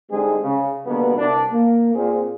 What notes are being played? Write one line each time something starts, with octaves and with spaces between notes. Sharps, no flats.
D3 G3 G#3 C4 D#4 G#4
C#3
B2 D3 G3 A#3 B3
C2 D4
A#3
A#2 C4 G#4